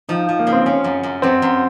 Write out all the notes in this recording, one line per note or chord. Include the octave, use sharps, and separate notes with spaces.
F3 D#4
F3
A#3
C#3
C4
C#3 C#4
F#2
F#2
F#2 C4
F#2